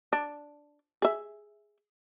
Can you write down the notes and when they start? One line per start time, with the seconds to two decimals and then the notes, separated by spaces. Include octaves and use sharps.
0.13 D4
1.02 G#4 E5